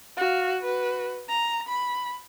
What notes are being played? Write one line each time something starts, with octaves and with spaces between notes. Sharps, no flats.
F#4 F5
F#4 B4
A#5
B5